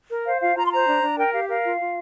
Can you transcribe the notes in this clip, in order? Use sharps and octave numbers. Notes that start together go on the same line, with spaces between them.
A#4
C5 F5
F4 F5
F4 A#5
C6
C5 A#5
D4
D4
A#4 G5
G4 F5
A#4 F5
F4
F4